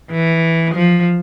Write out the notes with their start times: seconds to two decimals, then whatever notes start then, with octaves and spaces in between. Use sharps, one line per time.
0.11 E3
0.74 F3